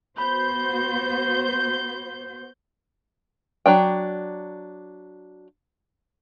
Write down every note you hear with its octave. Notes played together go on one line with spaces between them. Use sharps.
B3 F#4 C5 B5 G6
F#3 D4 G5